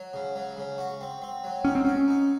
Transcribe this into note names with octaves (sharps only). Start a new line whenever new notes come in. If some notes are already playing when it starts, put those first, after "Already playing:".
Already playing: F#3
C#3
F#3
C#3
F#4
C4
C4
F#3
C#4 D#4
C4
C#4 F#4
D#4